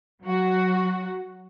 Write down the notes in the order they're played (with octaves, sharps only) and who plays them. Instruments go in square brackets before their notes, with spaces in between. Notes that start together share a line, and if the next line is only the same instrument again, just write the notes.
[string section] F#3 F#4